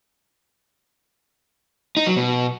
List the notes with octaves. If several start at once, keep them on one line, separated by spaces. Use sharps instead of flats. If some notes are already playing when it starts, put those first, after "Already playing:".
D#4
F#3
B2